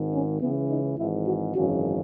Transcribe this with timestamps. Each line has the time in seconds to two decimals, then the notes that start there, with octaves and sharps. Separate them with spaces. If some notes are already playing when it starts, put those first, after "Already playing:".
Already playing: G#1 G#2 D#3
0.13 C#4
0.41 C#2 C#3 E3 B3
0.70 D#4
0.98 G#1 G#2 E3 E4
1.26 F#4
1.55 G#1 F#2 C#3 E3 F#4